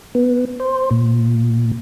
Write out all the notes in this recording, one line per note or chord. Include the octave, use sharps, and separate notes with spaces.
B3
C5
A#2